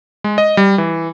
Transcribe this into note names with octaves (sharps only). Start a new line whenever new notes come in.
G#3
D#5
G3
E3